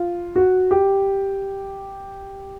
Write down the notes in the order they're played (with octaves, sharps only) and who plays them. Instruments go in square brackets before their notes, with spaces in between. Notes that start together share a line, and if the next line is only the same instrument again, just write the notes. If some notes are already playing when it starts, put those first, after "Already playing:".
Already playing: [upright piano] F4
F#4
G4